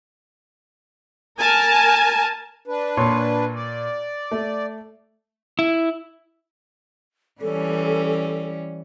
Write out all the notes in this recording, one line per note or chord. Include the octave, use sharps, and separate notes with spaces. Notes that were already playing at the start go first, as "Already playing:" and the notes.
A#4 G#5 A5
D4 B4
A#2 C#5 C6
D5
A3
E4
E3 G3 C#4 A4